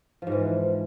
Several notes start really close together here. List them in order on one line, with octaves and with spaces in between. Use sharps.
F3 G#2 E3